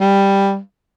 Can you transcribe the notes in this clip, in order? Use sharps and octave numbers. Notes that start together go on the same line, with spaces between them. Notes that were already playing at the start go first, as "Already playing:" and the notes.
G3